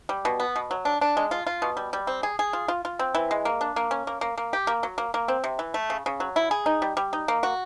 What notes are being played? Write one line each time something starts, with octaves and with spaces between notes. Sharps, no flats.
G3
B2
B3
B2
F#3
D4
D4
G#3
F4
F4
B2
G3
G3
C4
G#4
G#4
F4
F4
F4
C4
E3
G#3
A#3
D4
A#3
C#4
A#3
A#3
A#3
G4
A#3
F#3
A#3
A#3
C4
C3
E3
A3
C#3
C#3
F#3
E4
G#4
D#4
G3
G3
D#4
A#3
F#4